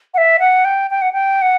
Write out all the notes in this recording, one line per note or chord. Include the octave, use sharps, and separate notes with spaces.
F#5
E5
F#5
G5
G5
F#5
G5
F#5